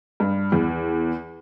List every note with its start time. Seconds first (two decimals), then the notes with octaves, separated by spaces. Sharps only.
0.20 G2
0.52 E2